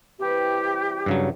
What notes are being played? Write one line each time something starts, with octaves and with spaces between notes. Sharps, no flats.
C3 E3 G3 G4
G2 C#3 F#3